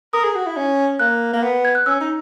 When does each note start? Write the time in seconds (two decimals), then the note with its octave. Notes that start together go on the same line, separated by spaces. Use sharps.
0.13 A#4 D#6
0.24 G#4
0.35 F#4
0.46 E4
0.57 C#4
0.99 A#3 F#6
1.33 A#3
1.43 B3
1.65 G#6
1.75 F#6
1.86 C#4 E6
2.00 D#4